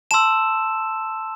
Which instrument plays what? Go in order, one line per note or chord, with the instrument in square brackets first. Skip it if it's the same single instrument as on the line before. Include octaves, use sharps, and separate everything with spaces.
[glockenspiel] A5 C6 E6 E7